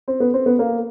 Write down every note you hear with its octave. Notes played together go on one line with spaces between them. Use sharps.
C4
B3
C4
B3
A#3